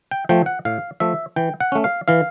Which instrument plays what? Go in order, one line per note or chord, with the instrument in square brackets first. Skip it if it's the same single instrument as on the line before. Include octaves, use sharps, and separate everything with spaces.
[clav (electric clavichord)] G5
F3 A3 G5
F#5
A2 F5
F3 A3 E5
E3 G5
F#5
A3 C#4
F5
E3 F5